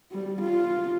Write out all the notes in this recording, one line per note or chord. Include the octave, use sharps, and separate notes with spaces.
G3
F4